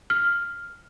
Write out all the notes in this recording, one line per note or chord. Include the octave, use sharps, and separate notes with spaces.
F6